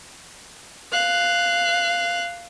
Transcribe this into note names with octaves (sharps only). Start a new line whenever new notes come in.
F5 F#6